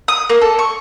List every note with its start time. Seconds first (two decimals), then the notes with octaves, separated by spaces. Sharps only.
0.08 D#6
0.29 A#3
0.41 A4
0.59 C#6